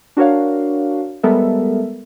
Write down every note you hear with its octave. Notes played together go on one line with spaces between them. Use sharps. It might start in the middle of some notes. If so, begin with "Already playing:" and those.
D4 F#4 A#4 C#5 F5
G3 G#3 B3 A4 A#4 E5